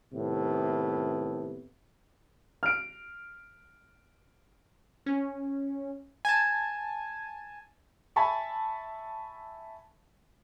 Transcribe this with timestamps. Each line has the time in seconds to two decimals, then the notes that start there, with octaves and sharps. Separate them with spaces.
0.13 A2 C3 D#3 B3
2.63 F6 D7
5.06 C#4
6.25 G#5 A5
8.16 E5 G#5 A5 B5 C#6